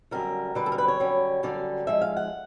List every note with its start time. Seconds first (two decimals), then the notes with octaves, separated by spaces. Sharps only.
0.11 F#2 D3 G3 A#4
0.55 F#2 D3 G3 B4
0.66 A4
0.72 A#4
0.78 B4
0.88 C#5
1.00 F#2 D3 G3
1.43 F#2 D3 G3 D5
1.87 G#2 F3 G#3 E5
2.01 F5
2.17 F#5